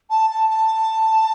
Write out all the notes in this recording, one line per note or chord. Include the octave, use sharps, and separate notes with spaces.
A5
A5
A5